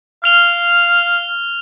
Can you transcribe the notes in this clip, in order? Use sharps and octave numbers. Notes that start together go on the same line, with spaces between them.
F5 F6 F7 G7